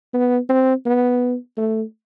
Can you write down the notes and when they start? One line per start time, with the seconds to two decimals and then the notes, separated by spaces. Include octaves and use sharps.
0.14 B3
0.49 C4
0.86 B3
1.57 A3